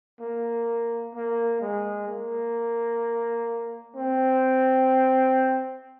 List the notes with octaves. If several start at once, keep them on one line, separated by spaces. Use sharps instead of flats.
A#3
A#3
G#3
A#3
C4